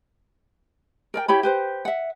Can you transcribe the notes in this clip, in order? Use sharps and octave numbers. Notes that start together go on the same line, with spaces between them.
A#4 D5 G5
E4 G4 C#5 B5
G4 B4 C5
E5 F#5